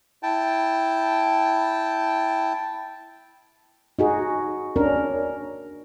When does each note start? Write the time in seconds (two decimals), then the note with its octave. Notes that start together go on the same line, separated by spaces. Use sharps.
0.23 E4 G5 A5
3.99 D#4 F#4 G#4
4.76 C#4 D4 A#4